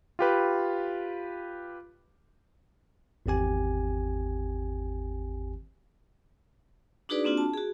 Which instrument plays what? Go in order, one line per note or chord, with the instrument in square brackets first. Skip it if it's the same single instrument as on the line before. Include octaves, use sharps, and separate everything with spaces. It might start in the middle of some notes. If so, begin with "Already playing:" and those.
[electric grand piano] F4 G4 B4
[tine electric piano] G#1 E2 C4 G4 G#5
[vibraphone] D4 D#4 F#4 G#4 B4 D5
A#3 C4 D4 F4 F#4
A5
F#4 G#4